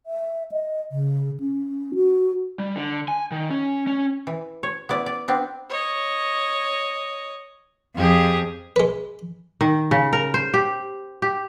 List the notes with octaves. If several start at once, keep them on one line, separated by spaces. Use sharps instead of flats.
E5
D#5
C#3
C#4
F#4
G3
D3
G#5
D#3
C#4
C#4
E3
C#5
B3 E4 D5
D5
B3 C4 D4
C#5 D#5
F2 G4 G#4
G#3 B4
D#3
C#3
A#4
C5
G4
G4